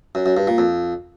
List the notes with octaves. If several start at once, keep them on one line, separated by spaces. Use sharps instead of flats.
F#2
F#2
G2
A#2
F2